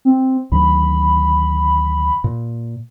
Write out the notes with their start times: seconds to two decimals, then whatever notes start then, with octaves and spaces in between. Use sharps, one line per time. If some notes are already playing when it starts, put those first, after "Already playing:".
0.05 C4
0.52 D2 D#3 F#3 B5
2.24 A#2